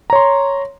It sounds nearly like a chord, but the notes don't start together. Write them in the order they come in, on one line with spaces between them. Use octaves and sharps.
A#5 C#5 C6